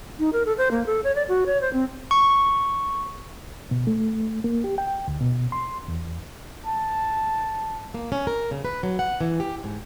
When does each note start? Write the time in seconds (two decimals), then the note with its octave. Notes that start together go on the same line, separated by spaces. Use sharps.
0.19 D#4
0.33 A#4
0.46 A4
0.58 C5
0.71 A#3
0.86 A4
1.04 C#5
1.15 D5
1.29 F#4
1.46 C#5
1.61 C5
1.73 C4
2.11 C#6
3.71 B2
3.87 A3
4.44 A#3
4.64 G4
4.78 G5
5.08 D2
5.20 B2
5.52 C6
5.88 E2
6.66 A5
7.94 A#3
8.12 C#4
8.27 A#4
8.51 C#3
8.65 B4
8.83 F#3
8.99 F#5
9.21 E3
9.40 G4
9.64 G#2